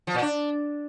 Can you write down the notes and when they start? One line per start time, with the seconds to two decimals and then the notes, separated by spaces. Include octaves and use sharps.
0.07 F3
0.14 A#2
0.22 D4